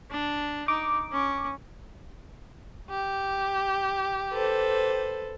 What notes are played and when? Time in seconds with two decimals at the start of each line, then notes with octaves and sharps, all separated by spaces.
0.10 D4
0.68 D#4 D6
1.12 C#4
2.90 G4
4.32 A4 B4 C5